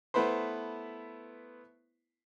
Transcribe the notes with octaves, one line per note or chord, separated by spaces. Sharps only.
A3 B3 E4 B4 C5